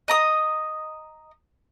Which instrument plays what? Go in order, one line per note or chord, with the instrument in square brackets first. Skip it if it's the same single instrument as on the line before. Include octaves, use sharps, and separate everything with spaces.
[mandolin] D#5 A#5 D#6